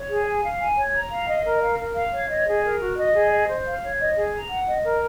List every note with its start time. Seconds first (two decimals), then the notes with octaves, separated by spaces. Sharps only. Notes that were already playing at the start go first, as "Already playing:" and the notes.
Already playing: C#5
0.09 G#4
0.26 G#5
0.43 F5
0.60 G#5
0.77 C#5
0.94 A#5
1.11 F5
1.28 D#5
1.45 A#4
1.62 F5
1.79 A#4
1.95 F5
2.13 C#5
2.30 D#5
2.47 G#4
2.64 A#4
2.80 F#4
2.98 D#5
3.14 G#4
3.31 D#5
3.49 C5
3.65 F5
3.82 C#5
3.99 D#5
4.16 G#4
4.34 A#5
4.50 F#5
4.67 D#5
4.84 A#4